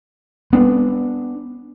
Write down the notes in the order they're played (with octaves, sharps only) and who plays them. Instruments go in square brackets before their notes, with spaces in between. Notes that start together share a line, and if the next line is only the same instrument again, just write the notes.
[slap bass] B3 D4